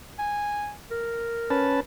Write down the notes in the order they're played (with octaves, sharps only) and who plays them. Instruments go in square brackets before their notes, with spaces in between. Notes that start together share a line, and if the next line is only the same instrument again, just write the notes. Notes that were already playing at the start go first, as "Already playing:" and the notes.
[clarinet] G#5
A#4
[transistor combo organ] C#4 B4 A5